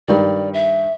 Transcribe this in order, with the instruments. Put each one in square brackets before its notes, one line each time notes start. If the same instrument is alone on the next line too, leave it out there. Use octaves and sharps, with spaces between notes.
[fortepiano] G2 D#3 [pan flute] D5
[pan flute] E5